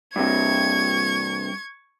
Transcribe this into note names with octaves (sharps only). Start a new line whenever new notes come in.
G2 C3 C#6 G#6